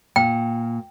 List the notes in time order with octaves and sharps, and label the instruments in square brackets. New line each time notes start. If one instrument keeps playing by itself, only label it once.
[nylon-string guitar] A#2 [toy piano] G5